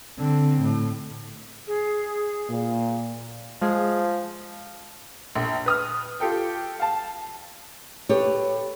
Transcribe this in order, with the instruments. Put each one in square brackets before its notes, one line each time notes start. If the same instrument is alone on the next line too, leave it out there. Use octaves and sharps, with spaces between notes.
[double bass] D3 C4
A2
[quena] G#4
[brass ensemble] A#2
[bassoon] F3 [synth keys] G#3 G#4
[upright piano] A#1
B4 D#6 F6
F4 G4 A4 G5
F5 A5
[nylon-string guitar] G4 A4 B4 C#5